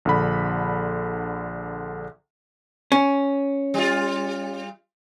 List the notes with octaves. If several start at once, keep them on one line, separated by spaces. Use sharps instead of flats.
A#1 D3 B5
C#4
G3 F4